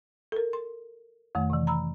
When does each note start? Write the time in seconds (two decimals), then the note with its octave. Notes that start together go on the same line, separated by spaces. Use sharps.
0.32 A4 A#4
0.53 C6
1.35 F2 D#3 A3
1.50 C3 E3
1.67 A#5 B5 E6